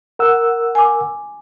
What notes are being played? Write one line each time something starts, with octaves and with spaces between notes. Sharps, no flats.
A#4 F#5 E6
G#5 D6